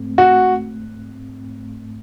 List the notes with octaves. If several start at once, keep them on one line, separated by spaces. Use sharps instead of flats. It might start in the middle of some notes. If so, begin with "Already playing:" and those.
Already playing: G#2 A3 C4
F#4